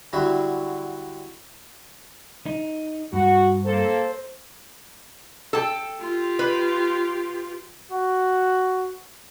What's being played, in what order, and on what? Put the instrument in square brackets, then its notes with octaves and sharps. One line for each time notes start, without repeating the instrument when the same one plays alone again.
[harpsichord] D3 F#3 G3 E4 F#4
[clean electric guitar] D#4
[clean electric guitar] G2 [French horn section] F#4
[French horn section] A#3 A4 [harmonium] C5
[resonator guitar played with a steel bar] A4 G5
[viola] F4 G4
[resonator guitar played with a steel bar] B4
[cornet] F#4